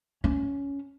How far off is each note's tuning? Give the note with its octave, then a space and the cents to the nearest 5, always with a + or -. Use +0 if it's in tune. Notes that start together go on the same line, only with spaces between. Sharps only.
C#4 +10